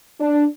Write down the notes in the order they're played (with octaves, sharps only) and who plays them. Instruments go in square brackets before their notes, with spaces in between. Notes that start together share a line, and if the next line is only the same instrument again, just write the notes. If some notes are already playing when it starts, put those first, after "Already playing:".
[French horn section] D4